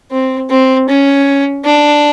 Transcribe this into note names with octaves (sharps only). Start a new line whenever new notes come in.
C4
C4
C#4
D4